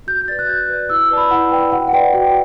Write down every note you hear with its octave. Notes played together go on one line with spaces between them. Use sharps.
F#4 G6
G6
B4 D5 A6
F#6
F#4 G6
B4 D5
E4 E6
B4 D5 A5
B5
E4 F#5
B4 D5 G5
F#4 F#5
F#5
B4 D5 G5
F#4 F#5